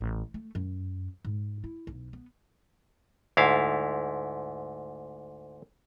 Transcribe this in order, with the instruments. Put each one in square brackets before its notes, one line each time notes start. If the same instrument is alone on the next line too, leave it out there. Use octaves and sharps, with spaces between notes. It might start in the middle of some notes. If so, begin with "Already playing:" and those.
[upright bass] A1
A3
F#2
G#2
E4
B1
B3
[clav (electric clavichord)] D2 G#2 E4 F5